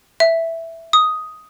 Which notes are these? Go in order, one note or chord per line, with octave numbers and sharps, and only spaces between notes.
E5
D#6